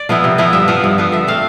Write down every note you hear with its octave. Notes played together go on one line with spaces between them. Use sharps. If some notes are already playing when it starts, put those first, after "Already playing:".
Already playing: D5
F3 B3 E4
C3
F3 B3 E4
G2 E5
F3 B3
G2
F3 B3
D3 E5
A3 C4 F5